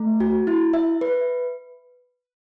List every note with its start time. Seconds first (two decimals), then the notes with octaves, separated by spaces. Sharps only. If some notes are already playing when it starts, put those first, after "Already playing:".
Already playing: A3
0.20 F#4
0.47 E4
0.73 E5
1.01 B4